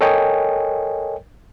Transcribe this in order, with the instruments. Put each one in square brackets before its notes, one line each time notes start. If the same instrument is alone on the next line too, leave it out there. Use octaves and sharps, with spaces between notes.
[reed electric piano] A4 A#4 C#5 D#5 G5 G#5